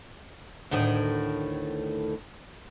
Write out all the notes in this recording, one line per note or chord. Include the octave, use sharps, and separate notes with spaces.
D2 A2 D#3